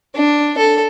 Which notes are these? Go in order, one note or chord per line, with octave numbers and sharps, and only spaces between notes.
D4
A4